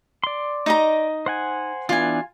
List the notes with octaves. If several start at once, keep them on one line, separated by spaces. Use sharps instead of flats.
D5 C6
D#4 D#5 A#5
C5 F#5 G#5
E3 B3 D4 F4 G#5